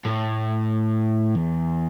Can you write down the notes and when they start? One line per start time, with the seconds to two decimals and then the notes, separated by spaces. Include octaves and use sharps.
0.05 A2
1.36 E2